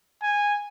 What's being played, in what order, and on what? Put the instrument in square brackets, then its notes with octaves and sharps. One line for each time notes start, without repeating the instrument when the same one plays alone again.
[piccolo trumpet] G#5